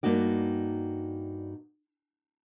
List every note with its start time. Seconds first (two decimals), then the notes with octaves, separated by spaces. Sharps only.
0.03 G2 A#3 D#4 F#4 D5